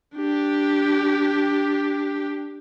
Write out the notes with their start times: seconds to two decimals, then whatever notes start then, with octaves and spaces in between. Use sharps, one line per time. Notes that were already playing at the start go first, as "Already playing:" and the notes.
0.16 D4 G4